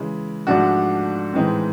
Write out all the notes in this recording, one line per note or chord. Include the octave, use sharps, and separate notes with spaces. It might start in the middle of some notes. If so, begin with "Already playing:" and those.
Already playing: C#3 E3 G#3
G#2 F3 A3 D4 F#4
A2 E3 G#3 C4 D#4